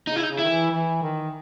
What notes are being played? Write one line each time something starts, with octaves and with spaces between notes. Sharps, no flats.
C#3 D#4
E4
D#4
C#3
E4
D#3
E3
E3
D#3